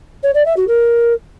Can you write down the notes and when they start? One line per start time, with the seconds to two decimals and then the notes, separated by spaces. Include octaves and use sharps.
0.23 C#5
0.34 D5
0.45 E5
0.56 F#4
0.68 A#4